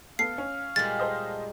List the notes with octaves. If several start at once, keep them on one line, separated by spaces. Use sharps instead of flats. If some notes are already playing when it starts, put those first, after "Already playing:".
B3 A4 F5 C7
C#4
A#2 G3 G#3 A6
A4 C5 D#5